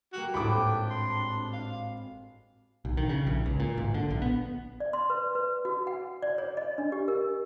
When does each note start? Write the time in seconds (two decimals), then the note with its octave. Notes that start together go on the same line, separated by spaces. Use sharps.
0.13 A#3 F#4 G4 F6
0.34 G#1 A2 C4 D4 G5 B5 D6
0.91 C6
1.53 F5
2.85 B1
2.97 D#3
3.09 C#3
3.27 A#1
3.46 C#2
3.60 A#2
3.78 G#1
3.94 D3
4.10 A#1
4.22 B3
4.80 D5
4.93 C6
5.10 B4
5.35 B4
5.65 F#4
5.87 F#5
6.22 D5
6.38 C#5
6.57 D#5
6.78 D4
6.92 G4
7.08 A#4